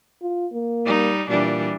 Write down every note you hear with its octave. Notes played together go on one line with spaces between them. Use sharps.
F4
A#3
G3 D#4
A#2 E3 G3 D4